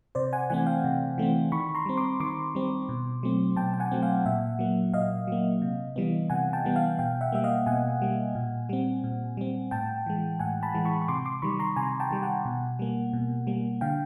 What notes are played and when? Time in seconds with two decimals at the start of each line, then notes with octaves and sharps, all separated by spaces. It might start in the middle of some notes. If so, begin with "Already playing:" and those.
0.15 C3 C5 D5
0.33 F#5 G#5
0.50 E3 A3 C4 F#5 G#5
0.66 F5 G5
0.84 C3
1.18 E3 A3 C4
1.52 D#3 B5 C#6
1.75 A#5 C6
1.86 G3 C4
1.97 C6 D6
2.20 D#3 C6 D6
2.55 G3 C4
2.89 B2
3.23 F#3 A3 C4
3.56 B2 G5 A5
3.74 G5
3.80 F#5 G#5
3.91 F#3 A3 C4
4.02 F5 G5
4.25 A#2 E5 F#5
4.59 F#3 A#3
4.93 A#2 D#5 F5
5.27 F#3 A#3
5.62 C3
5.96 E3 G3 B3
6.30 C3 F#5 G#5
6.53 G5 A5
6.65 E3 G3 B3
6.75 F5 G5
6.99 B2 F5 G5
7.21 E5 F#5
7.32 G3 A#3 E5
7.44 D#5 F5
7.66 B2 F#5 G#5
8.02 G3 A#3
8.35 A#2
8.69 G3 C4
9.04 A#2
9.37 G3 C4
9.71 A2 G5 A5
10.06 E3 G#3
10.39 A2 F#5 G#5
10.63 A5 B5
10.74 E3 G#3
10.85 B5 C#6
11.02 C#6
11.08 C3 C6 D6
11.25 C6 D6
11.42 D#3 G3 B5 C#6
11.59 A#5 C6
11.76 C3 G#5 A#5
12.00 G5 A5
12.11 D#3 G3
12.23 F#5 G#5
12.45 B2
12.79 G3 A#3
13.13 B2
13.47 G3 A#3
13.81 D3 F5 G5